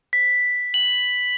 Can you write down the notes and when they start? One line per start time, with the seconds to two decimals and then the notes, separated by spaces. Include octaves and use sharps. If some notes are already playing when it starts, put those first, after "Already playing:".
0.13 B6
0.74 F#7